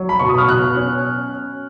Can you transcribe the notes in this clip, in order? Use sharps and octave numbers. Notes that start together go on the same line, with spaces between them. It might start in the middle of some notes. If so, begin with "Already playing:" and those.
Already playing: F#3
B5
B2 C#6
D#6
F6
B2 F#6
C#4